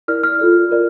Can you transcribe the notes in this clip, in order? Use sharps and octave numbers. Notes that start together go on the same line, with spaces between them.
E4 A#4 D5 F6
F6
F4 A4 D5
F4 A#4 D5